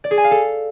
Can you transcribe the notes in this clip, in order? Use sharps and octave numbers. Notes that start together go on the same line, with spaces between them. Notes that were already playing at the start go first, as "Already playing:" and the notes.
D5
G#4
G#5
F5
A4